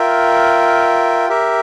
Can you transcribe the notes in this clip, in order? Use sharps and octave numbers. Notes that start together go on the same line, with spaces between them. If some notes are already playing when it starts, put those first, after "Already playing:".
Already playing: F4 A#4 E5 G5
G4 A#4 E5